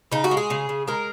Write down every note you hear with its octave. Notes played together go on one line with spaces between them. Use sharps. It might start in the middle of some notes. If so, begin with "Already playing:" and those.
C#3 D#4
F#4
G#3
G#4
C#3
C#3
G#3 A#4